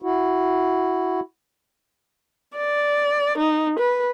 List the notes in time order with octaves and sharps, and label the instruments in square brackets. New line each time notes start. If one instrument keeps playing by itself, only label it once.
[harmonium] E4 F#4
[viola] D5
D#4
B4